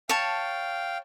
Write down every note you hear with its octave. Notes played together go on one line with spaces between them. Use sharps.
C#5 F5 G5 A5